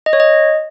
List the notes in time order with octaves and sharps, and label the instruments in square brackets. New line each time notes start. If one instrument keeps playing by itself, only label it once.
[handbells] D#5
C#5
D#5